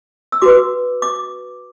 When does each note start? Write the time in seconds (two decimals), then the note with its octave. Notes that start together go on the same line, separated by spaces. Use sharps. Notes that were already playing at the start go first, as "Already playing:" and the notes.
0.32 E6
0.42 F#4 B4 D6
1.02 D6